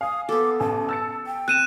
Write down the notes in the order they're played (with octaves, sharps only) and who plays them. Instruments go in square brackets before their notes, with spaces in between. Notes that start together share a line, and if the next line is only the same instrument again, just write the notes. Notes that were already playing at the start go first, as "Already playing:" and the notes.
[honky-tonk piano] F5 G#5 [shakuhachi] D#6
[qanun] B3 A4 [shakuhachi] D6
[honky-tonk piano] A1 [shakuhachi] A5
[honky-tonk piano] E6 A6 C#7
[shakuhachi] G5
[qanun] C4 [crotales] F#6 D#7 E7